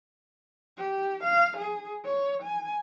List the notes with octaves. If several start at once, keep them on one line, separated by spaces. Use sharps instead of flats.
G4
F5
G#4
C#5
G#5